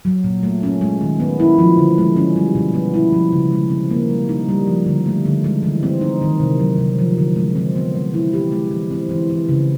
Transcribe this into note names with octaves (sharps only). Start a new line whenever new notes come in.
F#3
A#2
A3
C#4
G#3
D#3
B3
E4
F3
D3
G#3
C#4
G3
B2
B3
E4
F3
C#3
G#3
C4
A#3
G3
D#4
G3
F3
D3
A3
D3
G#3
E3
C4
D#4
D#3
C3
F#3
C3
F3
D3
G#3
C4
B3
G#3
E4
G4
G#3
E3
C4
E3
E3
C#3